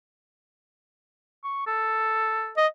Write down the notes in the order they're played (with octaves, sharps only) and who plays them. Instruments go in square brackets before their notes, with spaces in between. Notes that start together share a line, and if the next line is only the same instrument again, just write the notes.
[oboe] C#6
A4
[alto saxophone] D#5